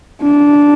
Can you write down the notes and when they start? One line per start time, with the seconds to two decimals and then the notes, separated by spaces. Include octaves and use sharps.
0.22 D4